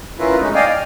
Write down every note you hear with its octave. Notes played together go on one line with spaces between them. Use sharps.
C#4 E4 F4 A#4 B4
G#3 A3 C#4 D#4
D5 D#5 F5 G5 G#5
F6